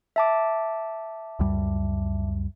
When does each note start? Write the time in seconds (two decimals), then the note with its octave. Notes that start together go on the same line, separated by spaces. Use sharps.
0.16 E5 A5 D6
1.39 C#2 F#2 G3